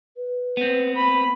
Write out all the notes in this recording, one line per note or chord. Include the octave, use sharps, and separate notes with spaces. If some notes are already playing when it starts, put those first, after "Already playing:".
B4
B3 C4
B5